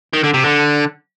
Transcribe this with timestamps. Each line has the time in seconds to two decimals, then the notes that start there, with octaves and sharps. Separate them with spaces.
0.13 D#3
0.23 D3
0.34 C3
0.44 D3